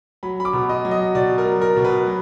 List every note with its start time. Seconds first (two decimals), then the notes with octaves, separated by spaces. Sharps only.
0.23 F#3 B5
0.40 B5
0.45 D6
0.53 B2
0.69 D#5
0.85 F#3
0.91 D#5
1.15 B2 D5
1.38 A#4
1.46 F#3
1.61 A#4
1.77 B2
1.85 B4
2.07 F#3